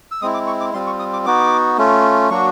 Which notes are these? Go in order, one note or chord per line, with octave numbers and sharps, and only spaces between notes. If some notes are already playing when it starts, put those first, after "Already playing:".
E6
G#3 C4 E4 D#6
D6
C#6
D6
G3 C4 F4 C6
C#6
D#6
D6
B3 D#4 F#4 D6
A3 C#4 F4
F#3 A#3 D4 F#4 C#6